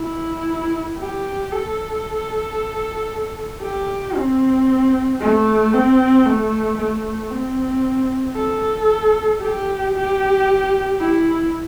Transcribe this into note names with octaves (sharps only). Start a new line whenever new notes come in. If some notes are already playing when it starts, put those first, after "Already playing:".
Already playing: E4
G4
A4
G4
C4
A3
C4
A3
A3
C4
A4
G4
G4
E4